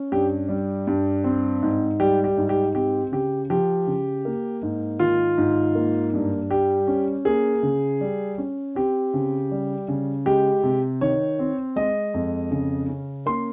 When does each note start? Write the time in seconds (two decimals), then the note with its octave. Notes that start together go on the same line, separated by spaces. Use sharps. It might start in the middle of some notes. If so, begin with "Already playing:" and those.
Already playing: C#4
0.12 G2 G4
0.49 G3
0.87 G2
1.24 C4
1.63 G#2
2.00 G3 G4
2.24 G4
2.37 G#2
2.49 G4
2.75 C4 G4
3.12 C#3 G4
3.50 F3 G4
3.87 C#3
4.25 A#3
4.62 G#2
5.00 D#3 F4
5.38 G#2
5.75 A#3
6.13 G2
6.50 G3 G4
6.87 C#4
7.25 A#3 G#4
7.63 C#3
8.01 G3
8.38 C#4
8.75 C4 G4
9.14 C#3
9.51 G3
9.88 C#3
10.26 G#3 G4
10.63 C3
11.01 D#3 C#5
11.39 C4
11.76 G#3 D#5
12.14 F2
12.51 C#3
12.88 C#4
13.26 A#3 C6